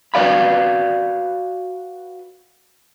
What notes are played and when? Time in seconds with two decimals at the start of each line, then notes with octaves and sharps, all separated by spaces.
0.14 F#4 B4 D5 F5 B5